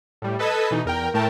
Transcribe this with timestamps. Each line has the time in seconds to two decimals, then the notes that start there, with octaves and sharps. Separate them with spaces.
0.22 A2 G3
0.39 A4 B4 D#5 A5 G#6 B6
0.71 B2 E3 D#4
0.85 E2 A#4 G5
1.14 A2 A3 A#4 G5 A5